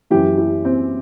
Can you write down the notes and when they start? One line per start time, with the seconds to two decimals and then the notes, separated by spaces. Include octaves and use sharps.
0.10 F#2 E3 E4 G4
0.38 E4 G4
0.65 C4